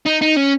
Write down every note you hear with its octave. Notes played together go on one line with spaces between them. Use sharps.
D#4
D#4
C#4